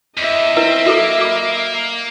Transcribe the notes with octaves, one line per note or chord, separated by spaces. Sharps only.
E2 D#5 E5
C4 E4 B4
A#3 F#4 A4 D6
B5 D6